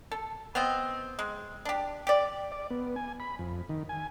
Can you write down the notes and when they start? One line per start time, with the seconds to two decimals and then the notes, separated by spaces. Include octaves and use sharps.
0.11 A4
0.55 B3 C4 D#5
1.19 G#3
1.65 D4 G4
2.07 G4 D5
2.52 D5
2.70 B3
2.96 G#5
3.20 B5
3.39 F2
3.69 D#3
3.89 G#5